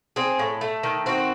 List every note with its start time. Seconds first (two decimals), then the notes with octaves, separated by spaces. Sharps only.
0.16 C4 G#4
0.39 A2
0.61 A3
0.83 D#3
1.06 C4 F#4